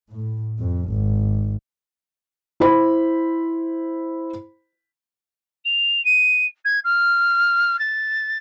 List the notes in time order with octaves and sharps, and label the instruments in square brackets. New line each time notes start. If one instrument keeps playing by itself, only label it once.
[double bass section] A2
F2
G#1
[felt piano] E4 C5 B5
[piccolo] F7
D#7
G#6
F6
A6